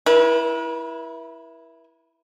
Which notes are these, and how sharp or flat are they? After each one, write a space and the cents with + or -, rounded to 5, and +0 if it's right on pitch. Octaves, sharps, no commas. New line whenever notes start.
E4 +0 B4 -45